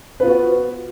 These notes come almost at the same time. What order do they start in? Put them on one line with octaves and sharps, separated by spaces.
B4 F4 B3 F#4